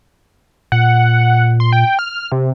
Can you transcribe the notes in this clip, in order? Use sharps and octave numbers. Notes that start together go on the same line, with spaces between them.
A#2 F#5
C6
G5
F6
C3